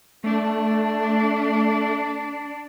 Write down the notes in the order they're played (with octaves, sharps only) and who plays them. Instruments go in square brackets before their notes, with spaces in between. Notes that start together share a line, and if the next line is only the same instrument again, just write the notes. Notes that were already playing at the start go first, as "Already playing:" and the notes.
[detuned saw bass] A3 [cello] D4